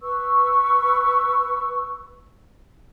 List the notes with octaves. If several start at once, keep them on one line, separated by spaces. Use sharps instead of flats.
B4 C#6 E6